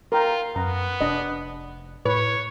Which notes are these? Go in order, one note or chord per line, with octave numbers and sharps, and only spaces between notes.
F4 A#4 G5
F#2 B3 A#5
F1 D4 D#5
A2 B4 C#5